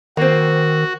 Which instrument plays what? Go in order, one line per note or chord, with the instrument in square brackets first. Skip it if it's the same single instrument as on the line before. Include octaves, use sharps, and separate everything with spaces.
[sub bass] D#3 [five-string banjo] A#3 C4 [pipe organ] F#4